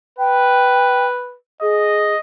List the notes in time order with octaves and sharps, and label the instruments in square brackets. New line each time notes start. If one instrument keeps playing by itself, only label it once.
[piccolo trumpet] B4 [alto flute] G5
[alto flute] G#4 [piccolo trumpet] D#5